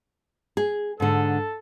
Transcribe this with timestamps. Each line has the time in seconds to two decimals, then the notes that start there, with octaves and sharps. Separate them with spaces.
0.57 G#4
1.00 G#2 D3 A4